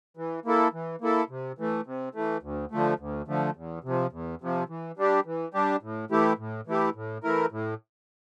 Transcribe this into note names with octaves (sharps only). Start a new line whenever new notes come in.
E3
A#3 E4 A4
E3
A#3 E4 A4
C3
E3 A3
C3
E3 A3
D2
D3 F3 A3
D2
D3 F3 A3
E2
C3 F3
E2
C3 F3
E3
G3 D4 G4
E3
G3 D4 G4
A2
E3 A3 E4 G4
A2
E3 A3 E4 G4
A2
E3 A3 E4 A#4
A2